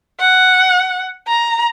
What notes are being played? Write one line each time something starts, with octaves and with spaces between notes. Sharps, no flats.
F#5
A#5